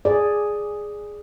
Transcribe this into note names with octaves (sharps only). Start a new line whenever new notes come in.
G#4 D5